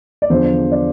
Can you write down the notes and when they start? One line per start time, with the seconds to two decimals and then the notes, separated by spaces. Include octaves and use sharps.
0.22 D5
0.30 E2 D3 F3 C5
0.72 D5